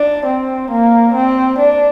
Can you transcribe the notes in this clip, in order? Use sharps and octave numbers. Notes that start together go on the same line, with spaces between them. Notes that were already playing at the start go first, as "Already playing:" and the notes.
Already playing: D4
C4
A#3
C4
D4